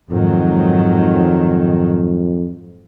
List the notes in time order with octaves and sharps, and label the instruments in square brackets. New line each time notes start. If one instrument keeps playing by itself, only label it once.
[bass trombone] F2 [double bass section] G#2 D#3 F#3